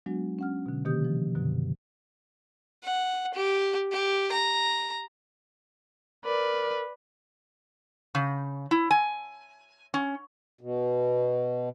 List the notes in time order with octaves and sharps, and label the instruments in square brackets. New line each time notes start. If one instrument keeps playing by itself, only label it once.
[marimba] F#3 G#3 B3 D4 F#4
C#4 F#5 F6
B2 D3
C3 D#3 A#3 G4 D#6 G6
F3
F#2 B2 D3 F#3
[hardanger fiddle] F#5
G4
G4
A#5
[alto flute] A#4 [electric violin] B4 [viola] D5
[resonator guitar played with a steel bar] C#3
E4
G#5
C#4
[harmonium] B2